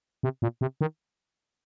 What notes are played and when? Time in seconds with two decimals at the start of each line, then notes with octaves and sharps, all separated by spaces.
0.23 C3
0.42 A#2
0.61 C3
0.81 D#3